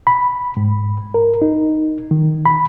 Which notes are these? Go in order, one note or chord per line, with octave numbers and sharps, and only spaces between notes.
B5
G#2
A#4
D#4
D#3
B5